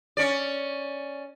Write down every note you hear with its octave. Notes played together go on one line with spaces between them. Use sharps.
C#4 D5